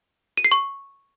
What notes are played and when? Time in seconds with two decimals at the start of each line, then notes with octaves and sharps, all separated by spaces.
0.37 D#7
0.44 C7
0.52 C#6